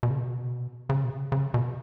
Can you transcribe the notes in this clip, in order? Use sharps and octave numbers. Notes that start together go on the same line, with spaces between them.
B2
C#3
B2
C#3
B2
C#3
C#3
B2